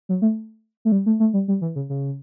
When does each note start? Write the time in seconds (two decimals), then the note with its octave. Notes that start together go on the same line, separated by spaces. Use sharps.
0.09 F#3
0.22 A3
0.85 A3
0.92 G3
1.06 A3
1.20 A3
1.34 G3
1.48 G3
1.61 E3
1.76 C#3
1.90 C#3